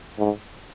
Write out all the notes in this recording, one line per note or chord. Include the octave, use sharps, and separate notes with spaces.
G#2